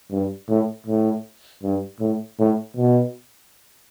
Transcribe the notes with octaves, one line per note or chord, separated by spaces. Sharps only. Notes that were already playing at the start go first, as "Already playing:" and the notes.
G2
A2
A2
G2
A2
A2
B2